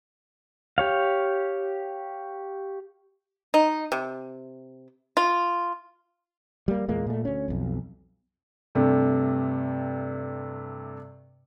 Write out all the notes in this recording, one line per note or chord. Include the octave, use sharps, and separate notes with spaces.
G4 C#5 F5
D#4
C3
F4
G3 A#3
E2 A#2 G#3 A#3
A#2 A3
D2 C#4
B1 F2
G2 C3 A3